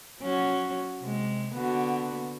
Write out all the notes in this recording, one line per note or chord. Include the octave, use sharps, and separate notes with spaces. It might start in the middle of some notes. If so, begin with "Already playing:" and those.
F#3 C#4 F#4
C3 G#3
D3 B3 F#4